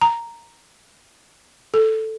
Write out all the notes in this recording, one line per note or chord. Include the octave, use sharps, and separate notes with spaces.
A#5
A4